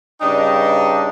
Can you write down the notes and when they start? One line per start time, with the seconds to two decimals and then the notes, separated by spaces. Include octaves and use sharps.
0.21 G2 C#3 D4 D#4 D#5 G5